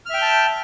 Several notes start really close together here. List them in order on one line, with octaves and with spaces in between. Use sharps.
F6 E5 G5 G6 A5